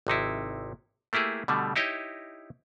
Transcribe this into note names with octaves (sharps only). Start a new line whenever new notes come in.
G#1 C3 D#4 E4
A3 A#3 E4 G4 G#4
B2 D3 G3 A3
D#4 E4 G4 C#5 D#5